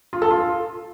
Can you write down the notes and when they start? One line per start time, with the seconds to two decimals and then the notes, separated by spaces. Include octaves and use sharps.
0.13 F4
0.22 A4
0.30 F4